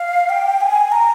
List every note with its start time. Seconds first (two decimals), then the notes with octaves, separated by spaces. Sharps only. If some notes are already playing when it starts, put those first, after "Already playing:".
Already playing: F5
0.29 G5
0.61 G#5
0.92 A#5